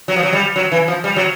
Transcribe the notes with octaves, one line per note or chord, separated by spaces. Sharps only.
F#3
F3
F#3
G3
F#3
E3
F3
G3
F#3